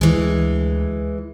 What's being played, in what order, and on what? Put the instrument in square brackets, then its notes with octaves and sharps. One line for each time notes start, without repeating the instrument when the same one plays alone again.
[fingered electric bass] D2 [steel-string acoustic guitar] E3 G#3